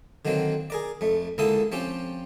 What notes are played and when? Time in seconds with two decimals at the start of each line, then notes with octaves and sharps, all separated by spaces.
0.25 D3 D#3 F#3 A#3 C4
0.70 G#4 A#4 D5
1.01 F2 A3
1.38 C#2 D3 A#3 E4 A4 D#6
1.72 F3 C4 C#4 F4 G4